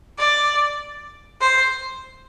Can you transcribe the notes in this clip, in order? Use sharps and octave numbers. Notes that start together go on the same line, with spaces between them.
D5
C5